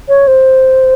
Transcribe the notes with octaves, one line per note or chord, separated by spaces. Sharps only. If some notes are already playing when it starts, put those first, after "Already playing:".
C#5
C5